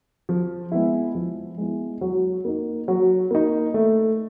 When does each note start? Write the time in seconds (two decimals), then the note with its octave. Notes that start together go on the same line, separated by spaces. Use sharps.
0.29 F3
0.72 G#3 B3 E4
1.15 F3
1.58 G#3 B3 E4
2.01 F#3
2.45 A#3 D#4
2.88 F#3
3.31 A#3 D#4
3.74 A3